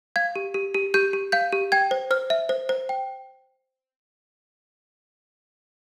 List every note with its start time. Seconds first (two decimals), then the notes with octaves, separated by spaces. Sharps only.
0.16 F5 G#6
0.36 G4
0.54 G4
0.74 G4
0.94 G4 G6
1.13 G4
1.32 F5 G6
1.52 G4
1.72 G5 G#6
1.91 C5
2.11 C5 F6
2.30 E5
2.49 C5
2.69 C5
2.89 G5